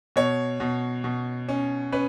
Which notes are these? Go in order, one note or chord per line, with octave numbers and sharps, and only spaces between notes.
B2 C#5
B2
B2
C#4
C#4 B4